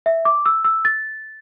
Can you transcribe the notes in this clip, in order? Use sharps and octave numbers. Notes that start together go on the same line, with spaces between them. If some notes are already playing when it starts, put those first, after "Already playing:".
E5
D6
E6
E6
A6